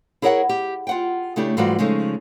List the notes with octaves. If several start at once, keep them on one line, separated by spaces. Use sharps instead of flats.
E4 G#4 A#4 C#5 E5 F#5
G4
F4 F#5 G5
C#3 A3 D4 E4 G4
G#2 E3 G3 F4 F#4 D5
C#3 F3 G#3 A3 D#4